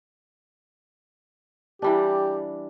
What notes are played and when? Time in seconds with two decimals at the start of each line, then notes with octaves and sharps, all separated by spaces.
1.82 E3 G3 D4 G4